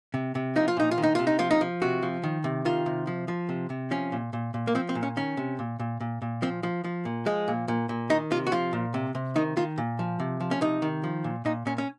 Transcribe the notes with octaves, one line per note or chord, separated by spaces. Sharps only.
C3
C3
F3 D#4
F4
A#2 D#4
F4
D#3
D#4
C3 F4
D#4
F3 F4
D#4
F3
C3 F#4
F3
D#3
C3
D#3 F4
C3
F3
F3
C3
C3
F3 C#4
A#2
A#2
A#2
A#3
F3 C4
C4
A#2
C#4
D#3 C#4
C3
A#2
A#2
A#2
A#2
F3 C4
F3
F3
A#2
F3 G#3
A#2
A#2
A#2
D#3 D#4
C3 F4
F#4
F3 F4
A#2
C3
C3
D#3 D#4
D#3 F4
A#2
F3
C3
F3
C#4
C3 D#4
D#3
F3
A#2
A#2 D#4
A#2 C#4
C#4